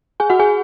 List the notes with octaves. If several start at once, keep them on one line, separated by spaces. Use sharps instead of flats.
G#4 G#5
F#4 F#5
G#4 G#5